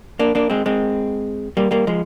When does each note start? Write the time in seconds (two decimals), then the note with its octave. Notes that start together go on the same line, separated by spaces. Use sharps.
0.19 A#3 D4
0.35 A#3 D4
0.50 G#3 C4
0.66 G#3 C4
1.57 G3 A#3
1.71 G3 A#3
1.87 F3 G#3